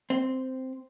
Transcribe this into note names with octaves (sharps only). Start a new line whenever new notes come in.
C4